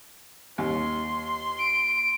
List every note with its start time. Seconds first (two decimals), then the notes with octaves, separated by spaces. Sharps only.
0.58 D#2 C6
1.59 D7